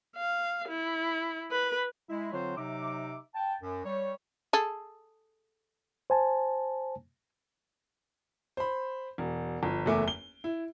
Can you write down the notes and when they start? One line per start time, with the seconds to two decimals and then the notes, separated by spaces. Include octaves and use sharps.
0.17 F5
0.69 E4
1.51 B4
2.09 G#3 E4
2.33 D3 F#3 C4 F4 C5 C#5
2.57 C3 F#3 D#4 E5 D6
3.35 G5 A5
3.61 F#2
3.85 G3 C#5
4.53 G#4 A4
6.10 C5 G#5 A5
8.57 C5 B5
9.18 E1
9.63 G1 F3
9.86 F#1 E2 A3 E5 G#5 D6
10.08 G7
10.44 E4